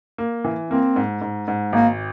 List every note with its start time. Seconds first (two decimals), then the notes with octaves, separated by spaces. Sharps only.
0.18 A#3
0.45 E3
0.70 A#3 C4
0.96 G#2
1.21 G#2
1.48 G#2
1.73 G#1 A#3